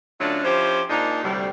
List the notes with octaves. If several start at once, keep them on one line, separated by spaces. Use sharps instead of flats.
D3 F#3 A3 C#4 D4 F4
F3 C#4 E4 G4 C5
A#2 G#3 D4 D#4
D2 A2 C3 G3